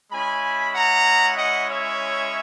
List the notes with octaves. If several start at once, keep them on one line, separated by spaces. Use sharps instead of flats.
G#3 C#4 E4 G#5 B5
F#5 A#5
D#5 F#5
C#5 E5